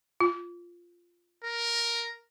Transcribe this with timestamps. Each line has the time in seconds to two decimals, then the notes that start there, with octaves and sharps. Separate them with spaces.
0.20 F4
1.44 A#4